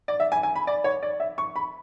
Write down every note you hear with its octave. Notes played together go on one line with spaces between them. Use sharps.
D5
E5
G#5
G#5
B5
D5
C#5
D5
E5
C#6
B5